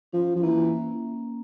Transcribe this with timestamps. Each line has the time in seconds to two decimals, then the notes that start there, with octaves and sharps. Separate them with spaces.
0.13 F3 C#4
0.36 F3
0.43 E3 A#3